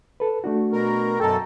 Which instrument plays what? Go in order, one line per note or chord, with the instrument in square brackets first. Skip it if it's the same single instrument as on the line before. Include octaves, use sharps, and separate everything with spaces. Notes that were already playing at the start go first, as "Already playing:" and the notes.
[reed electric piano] A4 B4
A3 D4 F#4
[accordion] B2 A#4
[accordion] F#2 B2 A4 [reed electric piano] G5 A#5